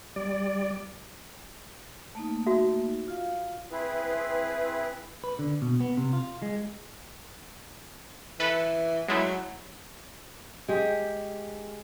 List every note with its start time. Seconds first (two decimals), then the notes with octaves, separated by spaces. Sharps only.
0.16 G3 D5
2.15 A3 A#3 D#4
2.47 F#4 E5
3.08 F4 F5
3.71 C4 E4 G#4 B4
5.24 B4
5.39 D3
5.62 B2
5.81 B3
5.97 C3
6.13 F4
6.42 G#3
8.40 E3 A4 B4
9.08 F#3 G#3 A3 E4
10.68 G#3 G4